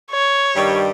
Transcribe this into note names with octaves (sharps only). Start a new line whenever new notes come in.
C#5
G2 D#3 G3